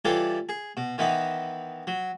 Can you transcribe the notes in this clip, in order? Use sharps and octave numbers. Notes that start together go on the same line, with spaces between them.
E3 G3 F4 A4 C#5 D5
G#4
B2
D#3 E3 B3 D#4
F#3